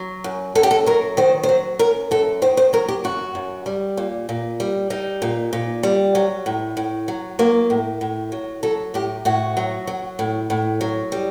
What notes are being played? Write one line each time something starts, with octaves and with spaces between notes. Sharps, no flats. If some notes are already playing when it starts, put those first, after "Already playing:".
Already playing: F#3
F#2
F#2 A4
G4
A4
F#3 A#4
D#3 C5
C5
F#3
F#2 A#4
F#2 A4
D#3 C5
C5
F#3 A#4
G4
F#2 F#4
F#2
G3
A#2
A#2
G3
G3 D#4
A#2
A#2
G3
F#3
A2
A2
F#3
F#3 A#3
A2
A2
F#3
F#3 A4
A2 G4
A2 F#4
F#3
F#3
A2
A2
F#3
G3